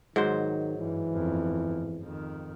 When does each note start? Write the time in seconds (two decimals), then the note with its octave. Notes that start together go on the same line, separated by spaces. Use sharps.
0.16 G#2 D#3 F#3 C5
0.78 G2 E3
1.11 G1 F2
2.02 F2 D#3